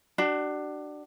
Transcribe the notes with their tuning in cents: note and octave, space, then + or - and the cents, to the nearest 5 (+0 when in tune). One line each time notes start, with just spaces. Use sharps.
D4 +15 F#4 +40